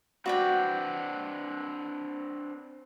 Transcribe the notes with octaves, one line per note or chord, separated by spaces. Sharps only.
C4 D4 F#4 B4 D5 G5